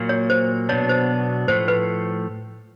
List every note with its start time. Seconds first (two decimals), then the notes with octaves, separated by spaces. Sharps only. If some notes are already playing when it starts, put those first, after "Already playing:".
Already playing: A#2 F#3 A#3
0.09 C#5
0.30 C5
0.69 B2 F#3 B3 D4 C#5
0.89 C5
1.48 A2 F3 A3 C5
1.68 B4